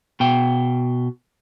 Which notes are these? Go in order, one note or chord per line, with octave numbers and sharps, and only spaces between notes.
B2 G5